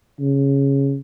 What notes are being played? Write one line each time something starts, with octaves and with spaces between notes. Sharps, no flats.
C#3